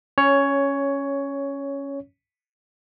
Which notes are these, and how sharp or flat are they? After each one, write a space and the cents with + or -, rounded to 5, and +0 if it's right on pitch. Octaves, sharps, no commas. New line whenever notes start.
C#4 +0 C#5 +10